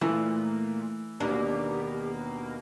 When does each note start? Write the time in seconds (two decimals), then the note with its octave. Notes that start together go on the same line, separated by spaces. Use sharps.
0.01 A#2 E3 A3
1.20 D#2 B2 A#3 D4 G4